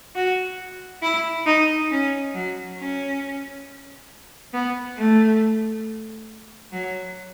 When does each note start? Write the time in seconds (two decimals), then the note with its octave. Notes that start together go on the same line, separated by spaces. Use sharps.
0.15 F#4
1.02 E4
1.46 D#4
1.91 C#4
2.34 F#3
2.78 C#4
4.53 B3
4.98 A3
6.72 F#3